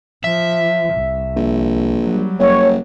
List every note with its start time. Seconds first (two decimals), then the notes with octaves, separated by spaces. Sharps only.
0.24 F3 E5
0.95 C2
1.36 A#1
2.06 F#3 G3
2.39 F#1 C#5